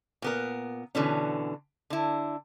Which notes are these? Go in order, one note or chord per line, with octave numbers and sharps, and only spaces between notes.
A#2 B3 A#4
B2 D3 E3 C#4
D3 E4